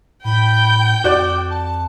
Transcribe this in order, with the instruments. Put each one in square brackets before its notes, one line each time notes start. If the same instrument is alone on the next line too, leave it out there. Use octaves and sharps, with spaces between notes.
[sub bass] A2 [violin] G5 G6 [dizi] B5
[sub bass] F2 [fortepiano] F#4 D5 [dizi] D6
[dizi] A5